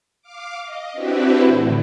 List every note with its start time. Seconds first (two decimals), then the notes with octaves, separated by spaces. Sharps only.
0.22 F5 D6
0.63 D#5
0.92 C4 D4 E4 F#4 G4 B4
1.43 A2 D3 E3